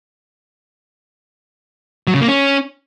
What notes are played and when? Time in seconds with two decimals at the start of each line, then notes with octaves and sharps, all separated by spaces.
2.07 F#3
2.14 C#3
2.21 A#3
2.28 C#4